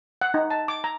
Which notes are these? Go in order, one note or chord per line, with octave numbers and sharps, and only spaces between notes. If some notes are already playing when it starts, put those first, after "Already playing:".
F#5
D#4
A5
D6
A#5